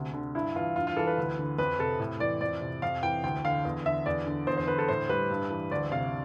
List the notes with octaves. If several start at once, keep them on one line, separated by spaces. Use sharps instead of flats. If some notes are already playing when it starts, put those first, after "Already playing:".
Already playing: D2 C3
D3
G2 E4
E3 F4
G2 F4
F4
E3 A4
B4
D2
D3
F2 B4
C3 A4
A2
E3 D5
F2 D5
C3
F2 F5
E3 G5
D2 G5
D3 F5
E2
D3 E5
E2 D5
D3
E2 C5
C5
D3 B4
A4
A2 C5
G3 B4
G2
E3
D2 D5
C3 F5